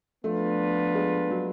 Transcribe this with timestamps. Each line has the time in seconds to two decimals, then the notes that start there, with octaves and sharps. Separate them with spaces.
0.24 F3 A3 B3 D4 F4 B4
0.95 G#3
1.31 F#3